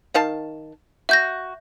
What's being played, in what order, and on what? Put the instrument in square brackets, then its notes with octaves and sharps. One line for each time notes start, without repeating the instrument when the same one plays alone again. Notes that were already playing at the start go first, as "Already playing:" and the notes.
[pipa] D#3 F5 A5
[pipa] F#4 [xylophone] E5 G6 A#6